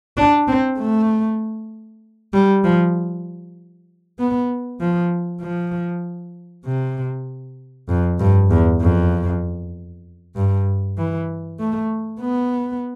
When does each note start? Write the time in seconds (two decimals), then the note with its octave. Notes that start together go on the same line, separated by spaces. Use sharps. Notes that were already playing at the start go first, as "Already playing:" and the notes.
0.17 D4
0.48 C4
0.79 A3
2.33 G3
2.64 F3
4.19 B3
4.80 F3
5.42 F3
6.65 C3
7.89 F2
8.20 G2
8.51 E2
8.81 F2
10.36 G2
10.98 E3
11.59 A3
12.21 B3